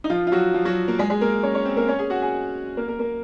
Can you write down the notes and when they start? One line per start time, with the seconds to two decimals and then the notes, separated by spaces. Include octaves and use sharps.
0.04 D#4
0.10 F3 F4
0.27 F4
0.32 F#3 F#4
0.54 F3 F4
0.65 F#3 F#4
0.88 A#3 A#4
0.99 G#3 G#4
1.10 G#3 G#4
1.21 A#3 A#4
1.43 C#4 C#5
1.55 C#4 C#5
1.65 C4 C5
1.77 A#3 A#4
1.88 C#4 C#5
1.99 G#4 G#5
2.10 F#4 F#5
2.22 G#4 G#5
2.77 A#3 A#4
2.88 A#3 A#4
2.99 A#3 A#4